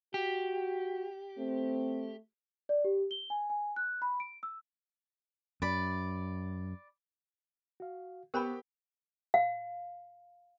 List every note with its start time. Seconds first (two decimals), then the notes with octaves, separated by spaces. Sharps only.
0.14 F#4 G4
1.38 A3 C4
2.69 D5
2.85 G4
3.11 G7
3.30 G#5
3.50 G#5
3.76 F#6
4.02 B5
4.20 D7
4.43 E6
5.62 F#2 D5 B5
7.80 F#4 F5
8.34 B3 G4 A#4 C5 G5 B5 C#6
9.34 F5